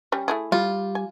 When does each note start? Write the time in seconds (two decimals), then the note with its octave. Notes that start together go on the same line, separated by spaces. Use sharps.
0.12 G3 C#4
0.28 A3 E4 G#4
0.52 G3 F4
0.95 G#5